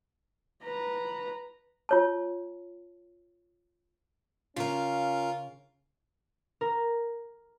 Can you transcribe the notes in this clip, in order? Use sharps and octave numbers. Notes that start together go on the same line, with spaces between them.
B4 A#5
F4 C#5 A5
C#3 C#4 F4 A#4 F5
A#4